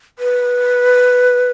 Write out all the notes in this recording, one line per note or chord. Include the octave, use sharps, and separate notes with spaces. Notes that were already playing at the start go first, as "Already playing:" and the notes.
B4